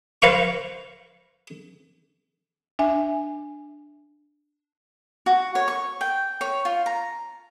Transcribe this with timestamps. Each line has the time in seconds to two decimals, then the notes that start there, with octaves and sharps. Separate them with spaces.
0.22 B4 C5 F5 A#5 C#6
2.79 D4 E5 G#5
5.26 F#4
5.55 C#5
5.68 C#6
6.01 G5
6.41 C#5
6.65 F4
6.86 A#5